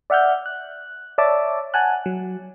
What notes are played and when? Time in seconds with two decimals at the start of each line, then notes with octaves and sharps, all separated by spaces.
0.10 D5 E5 F#5 F6 G6
0.46 F#6
1.18 C#5 D5 E5 A5 D6
1.74 F#5 G#5 A5 F#6
2.06 F#3